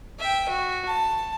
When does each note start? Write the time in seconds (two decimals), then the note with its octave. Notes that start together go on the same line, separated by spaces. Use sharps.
0.19 E5 G5
0.49 F#4
0.87 A5